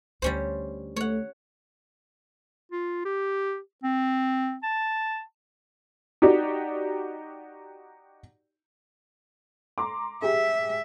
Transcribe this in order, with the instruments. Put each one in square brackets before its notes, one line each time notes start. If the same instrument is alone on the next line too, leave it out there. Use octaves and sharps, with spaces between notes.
[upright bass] D2 D3 [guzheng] G3 C#4 C5
[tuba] A3 [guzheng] C#5 F#5
[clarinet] F4
G4
C4
A5
[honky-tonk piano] D#4 F#4 G4 D5
A#5 C6 D6
[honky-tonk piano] G4 G#4 [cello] E5